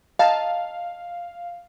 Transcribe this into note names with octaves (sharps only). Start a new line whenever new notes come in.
D#5 F5 A5 A#5